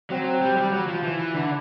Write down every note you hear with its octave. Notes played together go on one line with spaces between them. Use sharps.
F#3 C4
G3
G3
F#3
F3
E3
D3